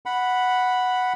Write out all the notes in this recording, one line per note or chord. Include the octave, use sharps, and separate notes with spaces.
F#5 B5